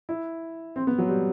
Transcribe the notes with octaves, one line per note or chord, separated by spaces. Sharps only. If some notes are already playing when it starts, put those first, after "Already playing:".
E4
C4
B3
F#3
G3